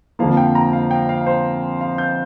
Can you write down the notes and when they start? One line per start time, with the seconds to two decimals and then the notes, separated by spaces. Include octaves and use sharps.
0.19 F2 D3 F3 A#3 F5
0.37 G5
0.55 A#5
0.73 F5
0.91 G5
1.09 F5
1.26 C5
1.81 F5
1.98 G6